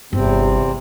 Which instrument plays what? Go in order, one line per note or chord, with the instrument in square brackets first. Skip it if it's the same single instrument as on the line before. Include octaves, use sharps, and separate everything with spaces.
[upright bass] G1 [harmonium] E2 C3 C4